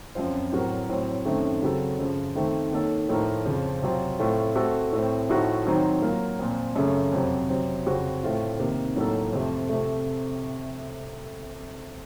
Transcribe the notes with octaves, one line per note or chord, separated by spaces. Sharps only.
F#2 F3 C4 F4 C5
A2 F#3 C4 F#4 A#4
A2 F#3 C4
F#2 D#3 A3 C4
C#3 F#3 C4 F#4 A4
F#2 C#3 F3
D#3 A3 C4
D#3 A#3 D#4 A4 C#5
A2 F3 A3 D#4 A#4
F2 C#3 F3
C3 F#3 C4 F4
A2 A3 C4 F4
A3 C4 F#4 A4
A2 A3 C4
A2 F3 A3 D#4 F#4
D#3 F#3 C4 D#4
F#3 A#3 F4 A#4
A#2 F3 C4
F#2 C#3 A3
F2 C3 F#3
C3 F#3 C4
F2 C#3 F3 C4 F#4
A2 A3 C4 F4
C3 D#3 A#3 D#4 A#4
A2 F#3 A#3 D#4 A4
F2 C3 F3 A3
C3 F3 A3